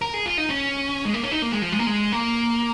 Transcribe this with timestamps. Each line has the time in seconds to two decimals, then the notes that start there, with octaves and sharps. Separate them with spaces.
0.02 A#4
0.14 G#4
0.26 F4
0.38 D#4
0.50 C#4
1.05 G#3
1.14 A#3
1.23 C#4
1.31 D#4
1.42 A#3
1.52 G#3
1.62 F3
1.72 G#3
1.79 A#3
1.87 G#3
2.12 A#3